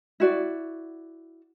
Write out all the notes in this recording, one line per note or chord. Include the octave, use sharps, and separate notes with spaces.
E4 F#4 D5